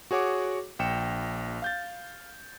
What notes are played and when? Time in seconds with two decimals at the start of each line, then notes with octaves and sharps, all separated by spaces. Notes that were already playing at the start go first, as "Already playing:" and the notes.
0.11 F#4 G#4 C#5 F#5 D6
0.79 A#1 G5 C#7 E7
1.62 F5 G6 A6